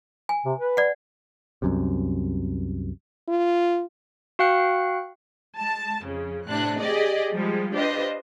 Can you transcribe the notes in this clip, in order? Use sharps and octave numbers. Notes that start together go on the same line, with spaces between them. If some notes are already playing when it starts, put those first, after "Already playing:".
G#5
C3
B4
D5 F#5
C2 F#2 C3
F4
F#4 F5 G5 F#6 C#7
G#3 A5
F2 C#3
A2 C3 D4 F#6
G4 G#4 D5 D#5
F3 G3 G#3
D4 F4 G4 B4 C5 D#5